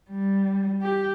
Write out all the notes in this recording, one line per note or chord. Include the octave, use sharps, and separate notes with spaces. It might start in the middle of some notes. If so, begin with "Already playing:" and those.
G3
G4